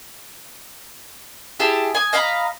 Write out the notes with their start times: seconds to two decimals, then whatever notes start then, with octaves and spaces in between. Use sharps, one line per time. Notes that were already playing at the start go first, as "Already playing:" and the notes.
1.60 E4 G4 G#4 A5
1.95 G#5 D#6
2.13 D#5 F5 A#5 B5